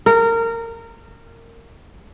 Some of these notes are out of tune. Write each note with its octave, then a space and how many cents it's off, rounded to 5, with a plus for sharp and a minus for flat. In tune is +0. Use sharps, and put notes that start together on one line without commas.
A#4 -20